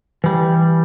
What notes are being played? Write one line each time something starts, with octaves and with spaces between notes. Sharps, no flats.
E3 G3